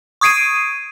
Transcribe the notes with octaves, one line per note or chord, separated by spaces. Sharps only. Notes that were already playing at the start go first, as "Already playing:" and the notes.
C#6 D#6 G#6 C7 D7 D#7